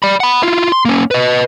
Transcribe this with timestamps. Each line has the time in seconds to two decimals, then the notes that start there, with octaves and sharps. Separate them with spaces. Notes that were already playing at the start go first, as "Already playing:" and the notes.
0.03 D5 B5
0.20 F#5 B5
0.43 E4 F4
0.72 C6
0.85 A#3 C#4
1.11 B4 D#5